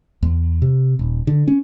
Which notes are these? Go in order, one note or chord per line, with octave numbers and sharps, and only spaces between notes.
E2
C3
D#1
D3
C#4